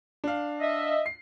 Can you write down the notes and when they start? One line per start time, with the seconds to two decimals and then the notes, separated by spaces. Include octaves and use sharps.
0.24 D4 F5
0.61 D#5 E5
1.06 C7